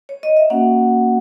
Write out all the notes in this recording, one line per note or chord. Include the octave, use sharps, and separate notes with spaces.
C#5
D#5
E5
A#3 C#4 F#4 F#5